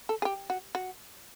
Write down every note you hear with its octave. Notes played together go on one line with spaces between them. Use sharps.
A4
G#4
G4
F#4
F#4